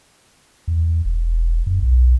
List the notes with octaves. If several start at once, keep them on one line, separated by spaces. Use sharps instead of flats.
E2
E1
F#2
B1